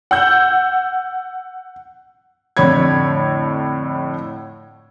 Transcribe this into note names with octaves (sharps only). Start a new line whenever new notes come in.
F#5 E6 G6
F2 A2 D3 C#5 B5 G#6